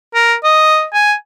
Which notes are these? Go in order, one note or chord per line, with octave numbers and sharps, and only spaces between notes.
A#4
D#5
G#5